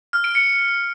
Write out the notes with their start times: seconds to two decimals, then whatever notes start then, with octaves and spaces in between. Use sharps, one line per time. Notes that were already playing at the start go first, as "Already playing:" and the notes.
0.13 F6
0.24 D7
0.35 C#7